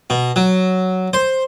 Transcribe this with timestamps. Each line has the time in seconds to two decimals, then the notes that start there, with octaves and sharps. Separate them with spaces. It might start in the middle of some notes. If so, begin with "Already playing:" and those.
0.10 B2
0.36 F#3
1.13 C5